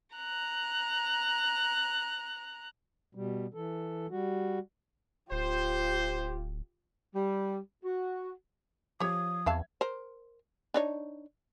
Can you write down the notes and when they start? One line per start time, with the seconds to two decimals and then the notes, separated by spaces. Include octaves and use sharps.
0.16 A#5 F#6
3.15 B2 G3
3.54 E3 A4
4.11 G3 F#4
5.31 D1 F4 G4 C5
7.14 G3
7.84 F#4
9.00 F3 G4 C#5 D#6 G#6
9.46 E2 C4 E5 F5 A5 G#6
9.81 A#4 C5
10.74 D4 D#4 C#5